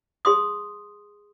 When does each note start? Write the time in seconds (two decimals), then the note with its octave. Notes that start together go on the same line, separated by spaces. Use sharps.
0.25 G#4 C6 D#6